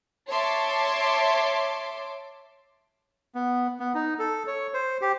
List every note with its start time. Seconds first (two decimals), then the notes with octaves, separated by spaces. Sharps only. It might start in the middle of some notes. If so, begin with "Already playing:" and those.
0.29 C#5 E5 A5 C6 D6
3.35 B3
3.80 B3
3.94 D#4
4.19 A4
4.47 C#5
4.74 C5
5.01 G4